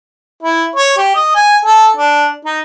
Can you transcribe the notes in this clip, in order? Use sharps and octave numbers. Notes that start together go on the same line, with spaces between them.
E4
C#5
G4
D#5
G#5
A4
D4
D#4